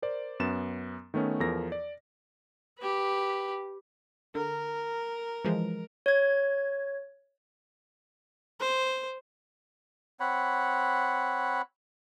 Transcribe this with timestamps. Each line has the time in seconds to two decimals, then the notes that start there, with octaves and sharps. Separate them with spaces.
0.02 A#4 C5 D5
0.40 F#2 B3 A6 E7
1.14 D#3 A3 B3 C#4
1.40 E2 F3 A4 A#4 A#6
1.72 D5
2.78 G4 B4
4.35 D3 A#4
5.45 E3 F3 G#3
6.06 C#5 G#6
8.60 C5
10.20 C4 C#5 F#5 B5